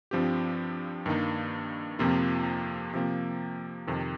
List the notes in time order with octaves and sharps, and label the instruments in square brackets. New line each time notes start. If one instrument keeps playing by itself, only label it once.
[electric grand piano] G2 F3 C4 G4
G2 D#3 A#3 D#4
F2 C3 F3 A#3 F4
C3 F3 A#3
F2 C3 D#3